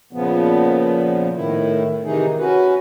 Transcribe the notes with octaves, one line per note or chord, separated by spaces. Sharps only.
A#2 C#3 F3 B3
A2 D#3 E4
C3 D#3 E3 D#4 G#4
C#4 F#4 B4